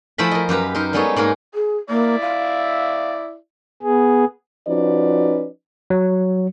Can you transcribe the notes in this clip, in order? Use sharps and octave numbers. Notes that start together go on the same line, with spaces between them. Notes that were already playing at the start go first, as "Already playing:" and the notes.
F3 A3 E4 C5 G#5 B5
A#4 D#5
F#2 G4 B4 A#5
D#4 A#4 C5
G3 G#3 B3 D#4 A4 C#5
G#2 G#3 A#3 A#4
G#4
A#3 E4 D5 E5
F5
B3 G#4
F3 C#4 D#4 F#4 B4 D5
F#3